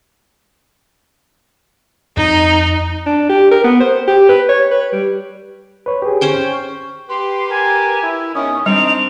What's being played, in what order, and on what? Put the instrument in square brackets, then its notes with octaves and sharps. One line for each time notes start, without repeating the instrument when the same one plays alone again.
[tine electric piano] F2 [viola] D#4
[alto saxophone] D4
G4
A#4
B3
C5
G4
B4
C#5
B4
G3
[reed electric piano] B4 C#5
G4 G#4
[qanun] C#4 C5 G5
[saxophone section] G4 B4 [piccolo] C6
[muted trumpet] A#4 [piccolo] G#5
[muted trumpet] E4
[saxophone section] E2 D#3 [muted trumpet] C#4 [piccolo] D#6
[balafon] G3 [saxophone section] C4 D4 [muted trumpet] D#4 [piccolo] F7